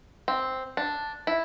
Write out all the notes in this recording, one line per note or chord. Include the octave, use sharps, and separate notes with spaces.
C4
D4
E4